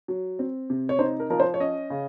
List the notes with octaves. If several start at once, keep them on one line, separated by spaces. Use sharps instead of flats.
F#3
C4
C3
C#5
D#4 C5
A#4
F3 A#4
C5
C#5
C#4 D#5
C#3